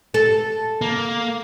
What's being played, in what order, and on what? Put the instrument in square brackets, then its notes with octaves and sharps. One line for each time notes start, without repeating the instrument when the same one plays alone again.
[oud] A4
[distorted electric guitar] A#3